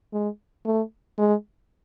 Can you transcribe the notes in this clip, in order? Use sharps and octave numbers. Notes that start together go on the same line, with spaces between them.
G#3
A3
G#3